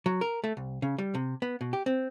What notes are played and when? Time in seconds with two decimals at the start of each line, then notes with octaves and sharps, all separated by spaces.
0.06 F#3
0.21 A#4
0.44 A3
0.57 C2
0.82 C#3
0.98 G3
1.15 C3
1.42 B3
1.61 B2
1.73 G4
1.86 C4